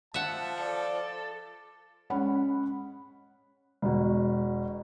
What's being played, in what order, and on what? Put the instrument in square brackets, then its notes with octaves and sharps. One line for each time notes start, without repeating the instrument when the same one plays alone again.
[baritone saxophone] F3 [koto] E5 F#5 [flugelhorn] A5
[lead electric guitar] A4 [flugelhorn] D5
[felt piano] G#3 C#4 F#5 B5
E1 B2